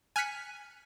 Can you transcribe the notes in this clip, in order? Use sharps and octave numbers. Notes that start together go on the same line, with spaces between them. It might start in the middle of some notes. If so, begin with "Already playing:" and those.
G#5 F6 F#6 B6 C#7